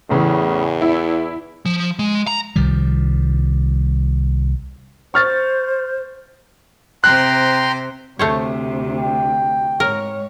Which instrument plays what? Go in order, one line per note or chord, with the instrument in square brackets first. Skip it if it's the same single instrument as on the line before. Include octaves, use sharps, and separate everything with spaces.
[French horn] E2 [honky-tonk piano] A2 C#3 E3
[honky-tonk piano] E4
[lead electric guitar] F3
G#3
A#5
[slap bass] C2 D#3 F3 G3
[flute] C5 [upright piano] C#6 F6 A6
[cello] C3 C5 [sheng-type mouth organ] G5 A#5 C6 [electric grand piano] F#6
[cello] D2 C3 [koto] A3 C5 C#5
[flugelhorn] G5
[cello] G#2 C#5 [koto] A#4